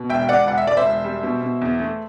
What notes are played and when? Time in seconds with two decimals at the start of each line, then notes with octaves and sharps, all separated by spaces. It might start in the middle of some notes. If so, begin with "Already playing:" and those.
Already playing: B2
0.09 E1 E5 G5
0.28 E1 D5 F#5
0.47 E1 F#5
0.58 E5
0.67 E1 D5
0.77 C5 E5
0.85 E1
1.04 G3
1.23 B2
1.42 B2
1.61 E2
1.80 A3